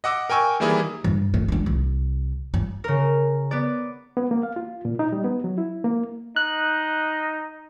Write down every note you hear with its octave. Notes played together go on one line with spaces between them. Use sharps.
D#5 F#5 D6 E6
A#4 G5 G#5 C#6 E6
D#3 E3 G3 A#3 E4 G#4
G2
A3
G#3 D4
C2
G2
C#3 A#4
B3 D5
B3
A#3
F5
F4
A#2
D#4
G3
B3
F#3
E4
A#3
D#4 F#6